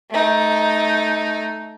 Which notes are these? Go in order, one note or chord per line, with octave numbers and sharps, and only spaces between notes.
A3 D#4